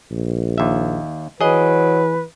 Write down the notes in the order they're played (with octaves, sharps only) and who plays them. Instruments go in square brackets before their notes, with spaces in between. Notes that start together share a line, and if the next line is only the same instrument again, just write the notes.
[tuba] A#1
[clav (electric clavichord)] D#2 E5
[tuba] E3 [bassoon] F#3 [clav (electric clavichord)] G#4 D#5 [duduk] B4